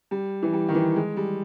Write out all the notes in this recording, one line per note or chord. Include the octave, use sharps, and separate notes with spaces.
G3
E3
G3
D#3
E3
G#3
G3